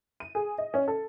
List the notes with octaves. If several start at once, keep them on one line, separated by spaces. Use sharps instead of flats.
D#7
G#4
D#5
C#4
A4